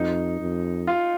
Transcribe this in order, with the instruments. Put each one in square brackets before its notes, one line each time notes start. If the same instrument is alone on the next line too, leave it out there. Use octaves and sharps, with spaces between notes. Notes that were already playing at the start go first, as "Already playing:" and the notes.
Already playing: [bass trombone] F2 [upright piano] D#4
[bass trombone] F2
[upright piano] F4